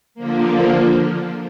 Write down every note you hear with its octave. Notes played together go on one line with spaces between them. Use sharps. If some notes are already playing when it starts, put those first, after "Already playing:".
D3 F3 A#3